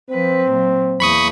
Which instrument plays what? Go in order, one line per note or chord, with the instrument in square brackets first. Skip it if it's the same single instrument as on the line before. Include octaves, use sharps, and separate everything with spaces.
[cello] F3 B4 [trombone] C4
[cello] A#2 F#3
[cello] E2 A#3 [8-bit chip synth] B5 C#6 D#6